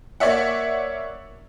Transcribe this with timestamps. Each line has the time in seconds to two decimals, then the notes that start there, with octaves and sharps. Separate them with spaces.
0.20 A#3 C#5 D5 E5 F#5